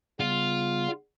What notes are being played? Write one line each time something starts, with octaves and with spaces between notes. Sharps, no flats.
C#3 G3 B3 F4